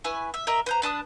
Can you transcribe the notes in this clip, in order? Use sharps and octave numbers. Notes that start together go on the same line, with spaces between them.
E4 B4 G#5 C#6
E5
A#4 D#5 E5 A#5
B4 C5 A#5
D4 B4 A5 D#6